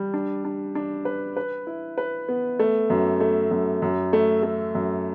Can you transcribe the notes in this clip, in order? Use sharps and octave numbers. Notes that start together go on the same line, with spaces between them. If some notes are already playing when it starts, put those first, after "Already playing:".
Already playing: G3
D4
D4
D4
B4
B4
E4
B4
B3
A3
F#2
A3
F#2
F#2
A3
A3
F#2